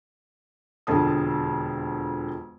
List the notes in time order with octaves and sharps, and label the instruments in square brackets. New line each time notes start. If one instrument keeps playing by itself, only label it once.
[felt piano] E1 F2 D3 A4 A5 D#6